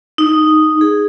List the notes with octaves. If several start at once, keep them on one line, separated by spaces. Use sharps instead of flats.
D#4
G#4